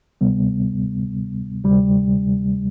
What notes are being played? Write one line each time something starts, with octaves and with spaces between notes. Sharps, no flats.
D2 C3 G3 B3
D2 C3 G3